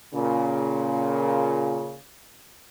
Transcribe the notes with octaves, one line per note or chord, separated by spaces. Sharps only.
A#2 C#3